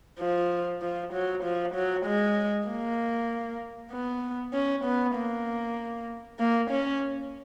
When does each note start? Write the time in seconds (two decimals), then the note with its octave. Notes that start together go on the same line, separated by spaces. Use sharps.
0.19 F3
0.82 F3
1.13 F#3
1.44 F3
1.75 F#3
2.06 G#3
2.68 A#3
3.92 B3
4.54 C#4
4.85 B3
5.15 A#3
6.39 A#3
6.71 C#4